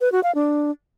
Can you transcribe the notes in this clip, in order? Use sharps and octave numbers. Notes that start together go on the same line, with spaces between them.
B4
F#4
F5
D4